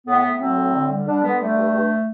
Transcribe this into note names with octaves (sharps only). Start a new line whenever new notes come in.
A2 B3
A2
F#3 C4
A2
D3
G3
D3 D4
D3 B3
G3 A3
G2
G2